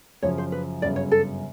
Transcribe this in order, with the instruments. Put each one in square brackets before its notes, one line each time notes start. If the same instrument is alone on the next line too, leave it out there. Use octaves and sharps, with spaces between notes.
[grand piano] F#2 C#3 F3 [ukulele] C#5
[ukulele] C5
B4
[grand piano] G1 F#2 C#3 [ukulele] D5
[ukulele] C#5
A4